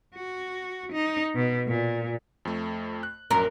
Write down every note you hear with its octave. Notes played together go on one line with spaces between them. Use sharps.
F#4
D#4
B2
A#2
F2 A3
F#6
A#1 F#2 A#4